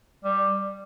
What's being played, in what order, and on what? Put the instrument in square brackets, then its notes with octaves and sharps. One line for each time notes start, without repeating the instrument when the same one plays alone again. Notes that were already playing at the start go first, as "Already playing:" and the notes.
[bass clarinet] G3